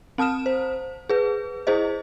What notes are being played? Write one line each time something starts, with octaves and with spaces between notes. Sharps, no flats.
C4 A5 D#6 F6 E7
C5
G#4 B4
E4 G#4 C5 D#5